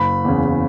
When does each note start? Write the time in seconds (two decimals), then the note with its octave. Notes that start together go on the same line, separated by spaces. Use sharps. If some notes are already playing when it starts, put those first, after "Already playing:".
Already playing: F#1 B5
0.25 E2 C#3